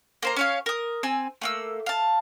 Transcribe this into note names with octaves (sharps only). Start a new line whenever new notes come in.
A#3 C5 A#5
C#4 C#5 F5
A#4 D#6
C4 G#5 E6
A3 A#3 E6
F5 A5